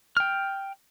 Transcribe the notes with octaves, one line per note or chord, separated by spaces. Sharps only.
G5 F6